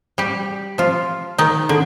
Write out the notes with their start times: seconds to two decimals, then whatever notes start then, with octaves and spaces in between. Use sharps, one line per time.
0.18 G3 G4
0.78 F3 F4
1.38 D#3 D#4
1.69 D3